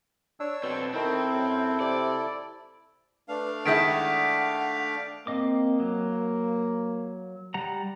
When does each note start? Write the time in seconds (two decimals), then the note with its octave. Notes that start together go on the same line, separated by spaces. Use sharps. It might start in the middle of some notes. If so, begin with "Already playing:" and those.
0.40 D4 C#5 E6
0.63 B2 C4 A4
0.94 D#3 C4 E4 A4
1.34 F#2
1.80 C3 D5
3.28 A3 D4 B4 F5
3.66 D#3 G#3 E4 F#5 G6 B6 D7
5.27 A#3 C4 D#5 D6
5.80 F#3
7.54 G3 F#5 A#5